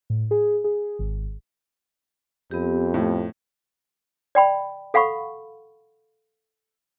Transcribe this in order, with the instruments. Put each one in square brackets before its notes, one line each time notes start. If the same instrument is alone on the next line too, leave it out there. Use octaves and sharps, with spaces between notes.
[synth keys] A2
G#4
G#4
G#1
[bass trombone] F2 [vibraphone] B3 G4
[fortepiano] A2
[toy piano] D5 G5 B5
A4 F5 F#5 B5 C#6